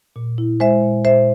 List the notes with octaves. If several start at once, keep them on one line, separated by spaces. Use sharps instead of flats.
A#2
E4
G#3 C5 E5
A#2
A#2 C5 E5